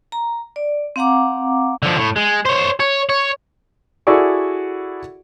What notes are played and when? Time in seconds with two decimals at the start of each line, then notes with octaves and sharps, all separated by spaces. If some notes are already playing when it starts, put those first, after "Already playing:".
0.12 A#5
0.56 D5
0.96 C4 F5 F#5 A#5 D6
1.83 D3 F3
1.98 A2
2.16 G#3
2.46 C5 C#5
2.80 C#5
3.09 C#5
4.07 E4 F#4 G#4 A4 D5 C#6